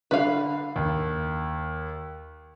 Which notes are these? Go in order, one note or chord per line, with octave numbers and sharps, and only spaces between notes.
D3 B4 F5
D#2